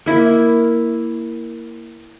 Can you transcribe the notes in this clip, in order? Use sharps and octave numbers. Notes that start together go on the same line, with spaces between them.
A#3 E4